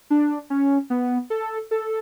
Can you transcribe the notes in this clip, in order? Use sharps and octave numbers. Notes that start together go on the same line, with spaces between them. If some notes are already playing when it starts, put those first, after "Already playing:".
D4
C#4
B3
A4
A4